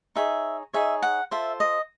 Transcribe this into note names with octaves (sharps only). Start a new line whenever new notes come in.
D#4 G#4 C#5 E5
D#4 G#4 C#5 E5
F#5
F4 A4 C5 E5
D#5